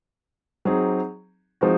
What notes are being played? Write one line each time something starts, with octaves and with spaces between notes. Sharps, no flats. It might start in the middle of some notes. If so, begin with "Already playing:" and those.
F#3 C4 D#4 G#4
F3 G#3 C4 D#4 F#4